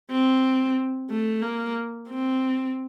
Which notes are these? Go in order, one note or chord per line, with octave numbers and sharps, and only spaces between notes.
C4
A3
A#3
C4